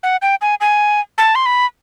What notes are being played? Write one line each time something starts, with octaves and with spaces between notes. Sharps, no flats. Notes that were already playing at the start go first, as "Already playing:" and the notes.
F#5
G5
G#5
G#5
A5
C6
B5